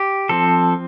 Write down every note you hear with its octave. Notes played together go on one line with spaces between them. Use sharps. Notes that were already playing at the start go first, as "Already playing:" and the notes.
Already playing: G4
F3 C4 A4